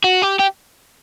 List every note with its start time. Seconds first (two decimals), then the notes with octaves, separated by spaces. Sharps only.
0.04 F#4
0.22 G4
0.39 G4